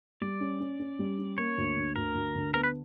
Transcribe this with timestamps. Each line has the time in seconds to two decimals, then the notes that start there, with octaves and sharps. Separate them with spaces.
0.22 G3 D5
0.41 C#4
0.60 C#4
0.80 C#4
0.99 G3
1.19 C#4
1.38 A#3 C#5
1.58 D2
1.77 D3
1.96 D2 A#4
2.15 D2
2.36 D3
2.54 B3 A#4
2.63 B4